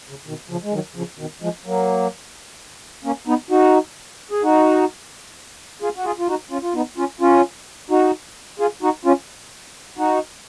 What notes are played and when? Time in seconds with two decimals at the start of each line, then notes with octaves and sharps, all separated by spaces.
0.09 C#3
0.27 B2 D#3
0.49 C#3 F3
0.63 G#3
0.73 D#3 F#3
0.96 C#3 F3
1.19 B2 D#3
1.42 F3 G#3
1.65 F#3 A#3
3.04 A#3 C#4
3.27 B3 D#4
3.50 D#4 F#4
4.31 G#4
4.43 D#4 F#4
5.82 F4 G#4
5.96 F#4
6.05 F4 G#4
6.19 F4
6.28 D#4 F#4
6.51 C#4 F4
6.62 F4
6.75 B3 D#4
6.97 C#4 F4
7.21 C#4 F4
7.90 D#4 F#4
8.59 F4 G#4
8.83 D#4 F#4
9.05 C#4 F4
9.97 D#4 F#4